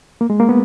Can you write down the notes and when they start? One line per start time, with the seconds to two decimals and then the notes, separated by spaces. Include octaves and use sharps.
0.21 A#3
0.30 G#3
0.39 A#3
0.49 B3